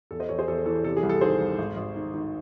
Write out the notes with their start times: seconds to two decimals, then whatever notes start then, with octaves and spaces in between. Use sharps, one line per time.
0.11 E2 A4
0.20 C5 D#5
0.29 E2 A4 C#5
0.39 G#4 C5
0.48 E2 A4
0.66 E3 A4
0.84 C3 A4
0.97 G#4
1.03 C2
1.09 A4
1.21 D#3 G#4 C5
1.40 C2
1.58 G#1
1.76 G#1
1.95 D#3
2.14 D#3